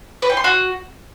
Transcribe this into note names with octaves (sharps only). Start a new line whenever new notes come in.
B4
G5
C6
F#4